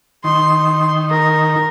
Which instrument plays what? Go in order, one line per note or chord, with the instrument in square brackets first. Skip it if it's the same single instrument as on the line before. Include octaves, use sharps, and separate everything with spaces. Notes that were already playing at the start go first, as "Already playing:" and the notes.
[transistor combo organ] D#3 [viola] C6
[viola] A#4